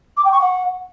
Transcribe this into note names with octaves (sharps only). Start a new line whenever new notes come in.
D6
G5
C#6
F#5